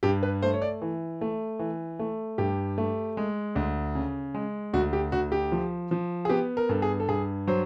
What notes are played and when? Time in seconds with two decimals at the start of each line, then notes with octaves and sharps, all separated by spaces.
0.03 G2 G4
0.23 B4
0.42 A3 C5
0.54 C#5
0.62 D5
0.82 E3
1.21 A3
1.59 E3
1.99 A3
2.38 G2 G4
2.78 A3
3.17 G#3
3.56 D2
3.95 C#3
4.34 G#3
4.73 D2 F#4
4.93 G4
5.12 D2 F#4
5.32 G4
5.52 F3
5.91 F3
6.25 G#4
6.29 B3 G4
6.57 A#4
6.69 G2 A4
6.82 G#4
7.00 A4
7.08 G2 G#4
7.47 F#3 C5